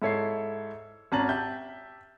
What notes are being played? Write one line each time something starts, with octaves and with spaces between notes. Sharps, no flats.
G#2 E4 A4 C#5 E5 C7
G#1 C#4 A5 A#5 A6 F#7
G4 E5 A5 G6